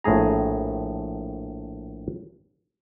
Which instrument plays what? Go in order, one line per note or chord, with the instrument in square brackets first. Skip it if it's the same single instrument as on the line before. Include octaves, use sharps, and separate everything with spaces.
[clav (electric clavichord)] A#1 A2 A3 G#4 A#5